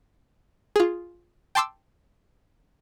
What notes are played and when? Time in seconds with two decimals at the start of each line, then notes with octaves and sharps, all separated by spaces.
0.76 F4 G#4
1.55 G5 A5 C6 D6 E6